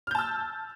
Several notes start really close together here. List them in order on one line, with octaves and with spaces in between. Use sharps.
F6 G6 A5 E6